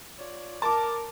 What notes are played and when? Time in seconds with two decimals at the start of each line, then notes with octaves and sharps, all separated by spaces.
0.18 F4 C#5 D5
0.62 A#4 A5 D6